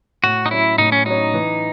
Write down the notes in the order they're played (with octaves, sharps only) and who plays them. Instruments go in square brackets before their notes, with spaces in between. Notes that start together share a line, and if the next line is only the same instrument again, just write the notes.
[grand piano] A2 [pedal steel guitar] F#4
[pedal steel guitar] D#4
[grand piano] F#3 C#4 [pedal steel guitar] E4
[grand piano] A2 [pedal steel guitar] D#4
[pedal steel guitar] C#4
[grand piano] F#3 C#4 [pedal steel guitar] D#4
[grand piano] E3